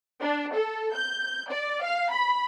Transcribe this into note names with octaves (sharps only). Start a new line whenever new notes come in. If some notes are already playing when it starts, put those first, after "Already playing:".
D4
A4
G6
D5
F5
B5